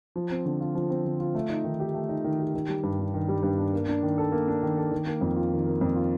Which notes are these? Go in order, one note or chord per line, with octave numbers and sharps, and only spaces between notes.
F3
C4
D3
F4
F3
C4
D3
F4
A3
D#4
D#3
G4
A3
D#4
D#3
G4
D#3
G3
G2
D4
D#3
G3
G2
D4
A#3
D4
D#3
A4
A#3
D4
D#3
A4
D#3
A#3
F2
F4
D#3
A#3
F2
F4